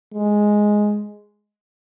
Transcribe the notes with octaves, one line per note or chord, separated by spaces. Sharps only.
G#3